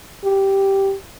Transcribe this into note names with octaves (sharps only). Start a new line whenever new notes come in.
G4